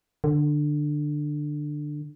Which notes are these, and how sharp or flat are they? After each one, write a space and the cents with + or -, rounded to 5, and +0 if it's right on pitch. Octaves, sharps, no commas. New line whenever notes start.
D3 +15